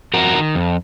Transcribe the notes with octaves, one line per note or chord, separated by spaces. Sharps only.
F2 F#4 A#4
D#3
F2